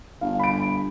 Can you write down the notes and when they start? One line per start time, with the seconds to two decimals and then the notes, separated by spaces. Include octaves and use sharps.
0.21 G1 F5
0.39 B5 D7